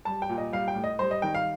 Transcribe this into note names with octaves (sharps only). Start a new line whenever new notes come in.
G3 A5
G5
A#2
D#5
G3 F5
G5
A2
D#5
G3 C5
D#5
D#3 G5
F5